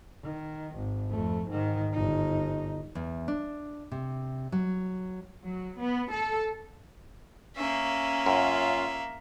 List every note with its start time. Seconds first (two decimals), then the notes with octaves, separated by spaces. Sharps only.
0.23 D#3
0.76 G#1
1.10 F2 A3
1.47 G#2 D#3
1.93 G1 D#4
2.95 E2
3.28 D4
3.91 C3
4.52 F#3
5.44 F#3
5.79 B3
6.12 A4
7.56 A#3 C#4 E5
8.26 F#2 F4